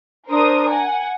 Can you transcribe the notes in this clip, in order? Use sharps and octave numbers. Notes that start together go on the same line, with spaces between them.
D4 A#4 C5 D#6
F#5 G#5